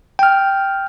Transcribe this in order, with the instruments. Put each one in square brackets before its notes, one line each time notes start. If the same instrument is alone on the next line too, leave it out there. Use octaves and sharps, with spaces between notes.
[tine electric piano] G5 F6